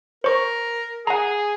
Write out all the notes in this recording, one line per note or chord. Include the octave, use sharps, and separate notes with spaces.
A#4 C5 C#6
G#4 F#5 A#5